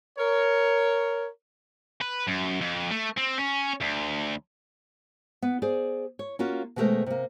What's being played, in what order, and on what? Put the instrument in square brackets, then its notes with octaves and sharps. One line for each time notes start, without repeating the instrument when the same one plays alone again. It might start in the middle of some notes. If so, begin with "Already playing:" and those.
[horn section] A#4 C#5
[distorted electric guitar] B4
F#2
F2
A3
C4
C#4
D2
[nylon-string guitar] B3
G#4 C5 D5
C#5
A#3 C#4 F4 F#4
B2 D#3 G#3 A3 A#4 C5
C3 A#3